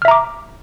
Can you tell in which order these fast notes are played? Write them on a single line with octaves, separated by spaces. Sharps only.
F6 E5 A#5 D6